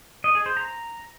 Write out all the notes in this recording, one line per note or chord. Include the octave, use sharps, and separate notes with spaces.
D#5
G#4
C5
A#5